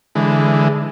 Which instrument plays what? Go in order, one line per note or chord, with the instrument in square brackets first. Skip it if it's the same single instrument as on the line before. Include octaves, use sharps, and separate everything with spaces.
[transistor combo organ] D3 E3 G#3